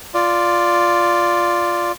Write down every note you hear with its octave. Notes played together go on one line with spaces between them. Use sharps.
F4 D5